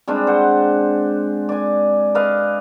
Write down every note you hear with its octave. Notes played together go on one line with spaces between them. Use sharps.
G3 G#3 C4 D4
C5 F#5
D5 G#5
B4 D5 D#5 F5